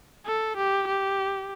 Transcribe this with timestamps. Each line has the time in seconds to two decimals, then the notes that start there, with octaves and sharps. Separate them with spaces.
0.26 A4
0.57 G4
0.88 G4